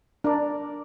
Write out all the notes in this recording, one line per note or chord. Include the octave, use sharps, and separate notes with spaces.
D4 A#4 D5